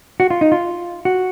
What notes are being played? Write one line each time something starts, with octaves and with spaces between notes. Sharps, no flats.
F#4
F4
D#4
F4
F#4